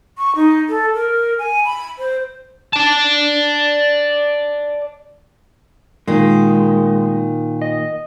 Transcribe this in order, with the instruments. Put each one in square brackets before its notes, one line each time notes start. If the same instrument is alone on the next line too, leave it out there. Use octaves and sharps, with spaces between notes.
[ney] C#6
D#4
A4
A#4
G#5
B5
C5
[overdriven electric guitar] D5 A5
[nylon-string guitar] A#2 D#3 [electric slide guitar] G#3
[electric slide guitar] D#5